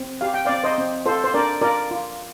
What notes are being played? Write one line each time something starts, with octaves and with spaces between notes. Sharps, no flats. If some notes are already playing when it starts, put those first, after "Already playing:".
Already playing: C4
G4 F5
G5
C4 D5 F5
C5 D#5
C4
F4 A4 C5
C5
D4 A#4 D5
F4 A#4 D5
F4